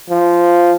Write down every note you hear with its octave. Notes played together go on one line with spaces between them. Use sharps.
F3